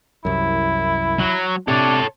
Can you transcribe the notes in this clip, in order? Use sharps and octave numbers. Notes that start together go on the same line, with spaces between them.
C2 F#2 E4
F#3
C3 D4 A4 C#5